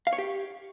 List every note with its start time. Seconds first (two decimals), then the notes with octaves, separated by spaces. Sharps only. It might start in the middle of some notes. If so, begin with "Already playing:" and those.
0.07 F5
0.13 C#5
0.18 G4